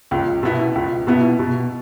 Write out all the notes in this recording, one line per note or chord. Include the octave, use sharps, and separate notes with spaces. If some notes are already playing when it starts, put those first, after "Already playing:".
C#2
B2 B3 E4
C#2
B2 B3 E4
B2